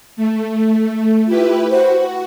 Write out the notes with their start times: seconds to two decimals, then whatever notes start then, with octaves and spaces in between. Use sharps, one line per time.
0.17 A3
1.28 E4 F4 G4 B4
1.70 F#4 C5